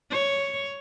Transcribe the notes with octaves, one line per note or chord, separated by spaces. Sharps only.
C#5